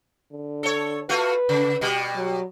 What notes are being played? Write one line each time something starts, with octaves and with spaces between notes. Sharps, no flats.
D3
A4 C#5
A3 F4 F#4 B4
C#3
B2 G3
F#3